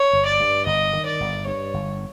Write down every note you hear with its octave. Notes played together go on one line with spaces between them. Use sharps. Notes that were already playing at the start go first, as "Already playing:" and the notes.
Already playing: C#5
G1
D5
G2
G1 D#5
D#3
D5
G1
G2 C#5
G1